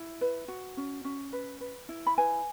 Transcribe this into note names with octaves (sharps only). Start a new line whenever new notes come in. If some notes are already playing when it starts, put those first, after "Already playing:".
Already playing: E4
B4
F#4
C#4
C#4
B4
B4
E4
B5
B4 G#5